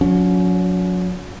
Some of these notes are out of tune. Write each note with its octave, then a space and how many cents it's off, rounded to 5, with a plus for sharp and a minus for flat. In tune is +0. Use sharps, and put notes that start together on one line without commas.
F#3 -35 C#4 +35